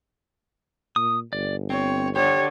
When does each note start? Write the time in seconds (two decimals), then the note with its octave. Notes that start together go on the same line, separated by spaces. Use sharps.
0.96 A#2 D#6
1.33 G1 D5
1.70 C4 C#5
2.16 D3 G4 C#5